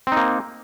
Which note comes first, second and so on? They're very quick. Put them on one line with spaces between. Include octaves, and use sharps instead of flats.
C4 D#4 A#3